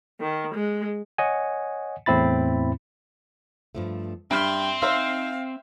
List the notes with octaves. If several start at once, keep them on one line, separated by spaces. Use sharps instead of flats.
D#3
G#3
C#5 D#5 F#5 G#5
E2 A2 C4 E4 B5 A6
G2 F3 A3
G2 C4 E5 G5 B5 C6 F6
D#4 C5 E5 F5